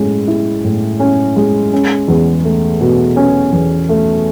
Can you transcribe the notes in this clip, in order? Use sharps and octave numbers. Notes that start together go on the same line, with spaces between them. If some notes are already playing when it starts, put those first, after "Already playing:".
Already playing: A2 G#3 C#4
E4
A2
C#4
G#3
C#4
E2
A3
B2
C#4
E2
A3